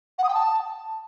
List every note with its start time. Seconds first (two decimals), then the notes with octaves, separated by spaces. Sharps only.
0.18 F#5
0.24 D#6
0.29 G5
0.34 A5